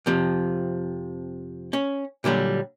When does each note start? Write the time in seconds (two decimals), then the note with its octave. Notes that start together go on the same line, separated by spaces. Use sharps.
0.06 F2 C3 F3
1.73 C#4
2.24 A#2 D3 F#3 G3